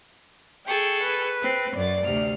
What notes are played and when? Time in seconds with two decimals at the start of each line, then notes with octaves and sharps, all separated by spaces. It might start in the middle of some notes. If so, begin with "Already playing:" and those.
0.66 G#4 A4 G5 C#6
1.03 B4
1.42 C4
1.76 F#2 D5 A6
2.05 D2 C3 F6